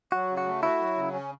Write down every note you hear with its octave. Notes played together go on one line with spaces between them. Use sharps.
F#3 F#4
C#3
F#4
A3
E4 F#4
F#3
C#3
C#4